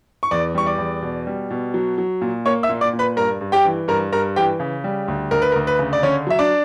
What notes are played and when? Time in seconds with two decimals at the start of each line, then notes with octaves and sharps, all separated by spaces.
0.23 C#6
0.31 E2 D5 D6
0.55 G3 C#6
0.66 D5 D6
0.78 E2
1.02 B2
1.27 G3
1.50 B2
1.74 F#3
1.98 F#3
2.21 A#2
2.45 A#3 C#5 C#6
2.63 E5 E6
2.69 A#2
2.81 D5 D6
2.93 A#2
2.99 B4 B5
3.16 G2 A#4 A#5
3.41 G2
3.52 G4 G5
3.65 E3
3.88 G2 A#4 A#5
4.12 G2 A#4 A#5
4.36 E3 G4 G5
4.60 C#3
4.84 G3
5.08 D2
5.31 D2 A#4
5.42 B4
5.52 A#4
5.55 D2
5.67 B4
5.79 C#3
5.93 D5
6.03 D3 C#4 C#5
6.27 F#3 E5
6.39 D4 D5